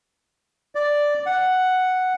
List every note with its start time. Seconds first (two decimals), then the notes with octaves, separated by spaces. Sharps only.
0.75 D5
1.26 F#5